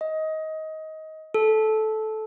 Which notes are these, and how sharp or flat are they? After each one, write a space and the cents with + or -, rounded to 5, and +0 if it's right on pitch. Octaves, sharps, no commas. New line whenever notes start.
D#5 +20
A4 -15